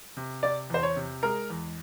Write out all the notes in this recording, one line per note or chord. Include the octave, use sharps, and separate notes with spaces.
C3
C3 D5
E2 C5
C#5
C3
G#3 A#4
E2